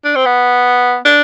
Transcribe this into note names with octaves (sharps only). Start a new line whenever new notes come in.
D4
C4
B3
D4